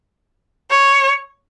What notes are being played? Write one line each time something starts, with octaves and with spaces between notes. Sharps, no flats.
C#5